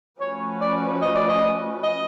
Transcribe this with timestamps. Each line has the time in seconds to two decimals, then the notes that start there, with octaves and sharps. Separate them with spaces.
0.21 F3 A3 C#4 F#4 B4 C#5
0.61 D5
1.02 D#5
1.15 D5
1.28 D#5
1.83 D#5